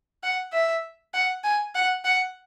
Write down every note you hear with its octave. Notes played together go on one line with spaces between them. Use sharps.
F#5
E5
F#5
G#5
F#5
F#5